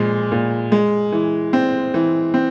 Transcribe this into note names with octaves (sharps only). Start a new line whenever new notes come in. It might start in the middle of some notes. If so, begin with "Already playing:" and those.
Already playing: A#2 F3 G#3
A#2
G#3
E3
C4
E3
C4